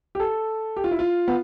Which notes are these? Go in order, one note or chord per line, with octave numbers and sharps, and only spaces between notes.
G4
A4
G4
F4
E4
F4
B3